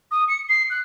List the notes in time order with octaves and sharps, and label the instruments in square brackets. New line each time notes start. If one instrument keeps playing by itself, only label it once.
[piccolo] D#6
C#7
C7
F#6